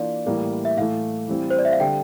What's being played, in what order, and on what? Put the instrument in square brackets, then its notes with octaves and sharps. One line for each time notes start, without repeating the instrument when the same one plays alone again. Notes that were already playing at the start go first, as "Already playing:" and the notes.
Already playing: [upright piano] E3 A#3 D4 F4 [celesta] D5
[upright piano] A2 E3 G3 A#3 E4
[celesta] E5
[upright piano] A2 E3 A3 [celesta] F5
[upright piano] E3 G3 C4 E4
[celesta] C5
D5
E5
F5
[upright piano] D3 G3 D4 [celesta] G5